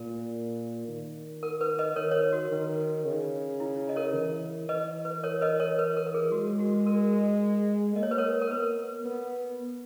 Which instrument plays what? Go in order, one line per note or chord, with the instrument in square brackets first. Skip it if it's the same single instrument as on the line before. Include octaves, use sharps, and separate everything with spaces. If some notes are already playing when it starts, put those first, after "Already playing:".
Already playing: [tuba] A#2 [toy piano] A#4
[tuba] D#3
[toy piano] A#4
B4
B4 D#5
[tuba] D#3 [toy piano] A#4 C#5
[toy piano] C#5
B4
F#4
[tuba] D#3
C#3
[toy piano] E4
D#5
A#4 C#5
[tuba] E3
[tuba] E3 [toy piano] B4 D#5
[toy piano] B4
A#4 C#5
B4 D#5
A#4 C#5
B4
A#4
A#4
G#4
[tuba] G#3 [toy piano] F#4
[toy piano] F#4
A#4
[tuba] A#3 [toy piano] D#5
[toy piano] C#5
B4
A#4 C#5
A#4
[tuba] B3 [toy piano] B4
[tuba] B3